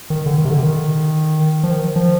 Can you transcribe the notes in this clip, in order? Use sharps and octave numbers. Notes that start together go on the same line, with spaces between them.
D#3
D3
D#3
C3
D3
D#3
F3
D#3
F3